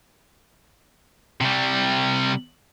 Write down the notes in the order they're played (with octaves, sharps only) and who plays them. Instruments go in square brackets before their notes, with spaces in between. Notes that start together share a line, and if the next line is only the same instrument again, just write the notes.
[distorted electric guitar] C3 G3